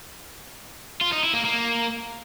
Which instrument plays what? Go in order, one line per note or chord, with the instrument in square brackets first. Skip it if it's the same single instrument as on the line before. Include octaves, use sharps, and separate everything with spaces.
[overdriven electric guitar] F4
D#4
E4
A#3
A#3